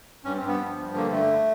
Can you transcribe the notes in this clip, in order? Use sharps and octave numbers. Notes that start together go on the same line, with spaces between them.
G2 C#4
C4
G2
B3
F3
G2
D3 A#3
D3 A3